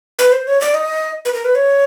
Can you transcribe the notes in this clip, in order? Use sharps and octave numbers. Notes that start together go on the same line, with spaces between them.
B4
C5
C#5
D5
D#5
B4
A#4
B4
C#5